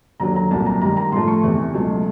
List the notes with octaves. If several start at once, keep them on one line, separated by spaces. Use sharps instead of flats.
D#2 D3 F#3 A#5
A#5
C2 A#2 F#3 A5
A#5
G#2 D#3 G3 A#5
A#5
A2 F3 A3 C6
C#6
E2 C3 E3
C#2 B2 F#3 A3